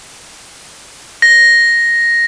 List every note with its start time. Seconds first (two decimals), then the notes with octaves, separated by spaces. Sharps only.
1.22 A#6